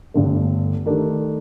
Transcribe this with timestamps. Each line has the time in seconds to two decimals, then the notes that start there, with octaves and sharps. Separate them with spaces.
0.14 G1 G2 D3 A3
0.86 D#3 A3 D4 G4